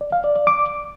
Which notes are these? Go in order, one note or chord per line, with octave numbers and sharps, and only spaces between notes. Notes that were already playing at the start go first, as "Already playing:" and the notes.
D5
F5
D5
D5
D6